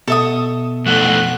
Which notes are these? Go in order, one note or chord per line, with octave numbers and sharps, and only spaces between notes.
B2 A4 E5 D#6
F2 A3 F#4 F#6